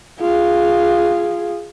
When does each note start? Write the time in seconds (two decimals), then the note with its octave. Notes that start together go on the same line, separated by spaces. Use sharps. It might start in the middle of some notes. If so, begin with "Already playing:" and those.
0.21 F4 G#4